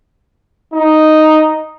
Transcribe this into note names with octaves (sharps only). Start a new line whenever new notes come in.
D#4